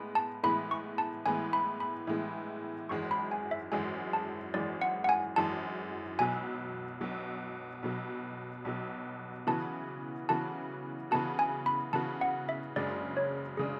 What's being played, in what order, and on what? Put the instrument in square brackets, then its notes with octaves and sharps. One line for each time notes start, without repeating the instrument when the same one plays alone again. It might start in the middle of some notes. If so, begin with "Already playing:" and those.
Already playing: [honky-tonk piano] A2 G#3 B3
[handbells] A5
[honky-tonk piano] A2 E3 G#3 B3 [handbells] B5
[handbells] C#6
A5
[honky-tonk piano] A2 E3 G#3 B3 [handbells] G#5
[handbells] B5
B5
[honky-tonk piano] A2 E3 G#3 B3
[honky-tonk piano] G#1 F#2 E3 G#3 [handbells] C#6
[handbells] B5
G#5
E5
[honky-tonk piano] G#1 F#2 E3 G#3 [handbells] G#5
[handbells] A5
[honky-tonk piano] G#1 F#2 E3 G#3 [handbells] D5
[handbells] F#5
F#5
G#5
[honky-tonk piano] G#1 F#2 E3 G#3 [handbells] A5
[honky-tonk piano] B1 B2 F#3 [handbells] G#5
[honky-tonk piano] B1 B2 F#3
B1 B2 F#3
B1 B2 F#3
[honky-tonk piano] C#3 E3 B3 F#4 [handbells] A5
[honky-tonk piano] C#3 E3 B3 F#4 [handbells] A5
[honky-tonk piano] C#3 E3 B3 F#4 [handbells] A5
[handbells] G#5
B5
[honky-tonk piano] C#3 E3 B3 F#4 [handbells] A5
[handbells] F#5
E5
[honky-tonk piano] F#1 F#2 C#3 G#3 D4 [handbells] D5
[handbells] C#5
[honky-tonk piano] C#3 G#3 D4 [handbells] G#4